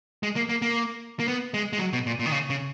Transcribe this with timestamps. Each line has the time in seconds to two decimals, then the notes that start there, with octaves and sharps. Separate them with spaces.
0.23 G#3
0.36 A#3
0.49 A#3
0.62 A#3
1.20 A#3
1.28 B3
1.54 G#3
1.73 G#3
1.79 F#3
1.93 B2
2.07 A#2
2.19 A#2
2.26 D#3
2.32 C#3
2.50 C#3